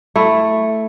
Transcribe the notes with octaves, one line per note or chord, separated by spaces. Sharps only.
A3 E4